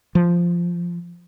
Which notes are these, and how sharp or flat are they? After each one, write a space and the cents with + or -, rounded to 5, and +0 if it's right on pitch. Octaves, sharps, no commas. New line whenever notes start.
F3 -10